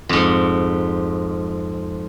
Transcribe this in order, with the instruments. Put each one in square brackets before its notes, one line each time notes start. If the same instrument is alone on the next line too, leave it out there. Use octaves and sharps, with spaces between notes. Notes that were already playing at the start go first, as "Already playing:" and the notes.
[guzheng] F2 G#2